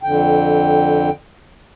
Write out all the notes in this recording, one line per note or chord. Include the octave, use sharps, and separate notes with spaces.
F2 D3 G5